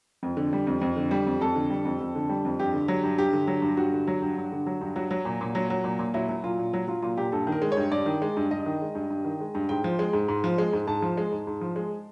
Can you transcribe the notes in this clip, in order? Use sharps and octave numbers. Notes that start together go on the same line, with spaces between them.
F2
D3
G3
F2
F2
D3
G3
F2
F2 A4
D3
G3
F2
F2
D3
G3
F2
G2 G4
D3
F#3
G2
G2 G4
D3
F#3
G2
G2 F#4
D3
F#3
G2
G2
D3
F#3
G2
F#3 F#4
F#3
A#2
A#2
F#3
F#3
A#2
A#2
F#3 E4
F#3
A#2 F4
A#2
F#3 F#4
F#3 F4
A#2 F4
A#2 G4
G2 A4
D#3
A#4
G#3
C#5
G2
G2 D5
D#3
G#3
G2
G2 D#5
D#3
G#3
G2
G2
D#3
G#3
G2
G#2 G5
F3
G#3
G#2
G#2
F3
G#3
G#2
G#2 A5
F3
G#3
G#2
G#2
F3
G#3